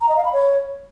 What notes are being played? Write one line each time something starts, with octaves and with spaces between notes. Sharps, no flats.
A#5
D#5
F5
B5
C#5